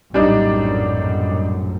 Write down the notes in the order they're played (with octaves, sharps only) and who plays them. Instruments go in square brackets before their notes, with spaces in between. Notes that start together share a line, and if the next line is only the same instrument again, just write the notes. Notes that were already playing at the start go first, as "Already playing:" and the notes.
[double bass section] A#1 F#2 A2 [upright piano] G3 D4 D#4